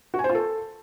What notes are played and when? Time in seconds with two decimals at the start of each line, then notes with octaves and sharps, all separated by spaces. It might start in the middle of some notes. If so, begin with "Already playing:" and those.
0.14 F#4
0.19 G#5
0.24 C5
0.30 F4
0.35 A4